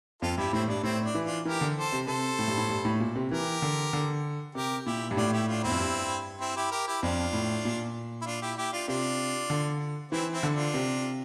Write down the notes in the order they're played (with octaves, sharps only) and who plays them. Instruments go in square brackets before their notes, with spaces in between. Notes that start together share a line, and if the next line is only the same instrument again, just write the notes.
[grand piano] F2 [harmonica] F4 A4
[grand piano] G2 [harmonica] E4 G4
[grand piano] A2 [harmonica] C4 E4
[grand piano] G2 [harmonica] D4
[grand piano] A2 [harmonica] C4 E4
[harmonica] D4
[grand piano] E3
[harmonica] D4 F4
[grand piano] E3 [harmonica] G4 A#4
[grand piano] D3
[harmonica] A4 C5
[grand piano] C3
[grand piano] C3 [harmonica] A4 C5
[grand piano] A2
G2
A2
G2
A2
A#2
C3
[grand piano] E3 [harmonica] G4 A#4
[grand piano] D3
D3
[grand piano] C3 [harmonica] G4 A#4
[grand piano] A#2 [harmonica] E4 G4
[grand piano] G2
[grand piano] A2 [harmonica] D4 F4
[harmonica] E4 G4
D4 F4
[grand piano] E2 [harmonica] C4 E4
[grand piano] F2
G2
[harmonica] C4 E4
E4 G4
G4 A#4
E4 G4
[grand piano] F2 [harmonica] D4 F4
[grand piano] A2
A#2
[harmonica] E4
D4 F4
E4 G4
E4 G4
D4 F4
[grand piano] C3 [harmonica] D4 F4
[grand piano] D3
[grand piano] E3 [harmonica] C4 E4
[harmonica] C4 E4
[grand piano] D3
[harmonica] D4 F4
[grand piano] C3